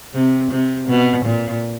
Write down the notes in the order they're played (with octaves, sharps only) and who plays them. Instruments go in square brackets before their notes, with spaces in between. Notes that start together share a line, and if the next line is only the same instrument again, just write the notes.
[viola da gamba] C3
C3
B2
A#2